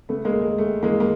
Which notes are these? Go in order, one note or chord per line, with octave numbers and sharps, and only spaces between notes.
C#3 A3 B3
G#3 A#3
D#2
G#3
D#2 A3
E3 G#3 A#3
A#3